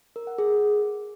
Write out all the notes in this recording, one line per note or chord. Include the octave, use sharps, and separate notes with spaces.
A#4
F#5
G#4